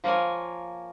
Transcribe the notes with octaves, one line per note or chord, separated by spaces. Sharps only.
F3 A#3 A#4 C#5 G#5